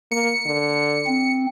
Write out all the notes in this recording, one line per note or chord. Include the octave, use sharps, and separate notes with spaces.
A#3 C#7
D3
C4